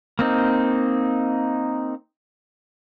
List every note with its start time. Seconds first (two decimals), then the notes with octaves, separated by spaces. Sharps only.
0.19 A#3 C4 D#4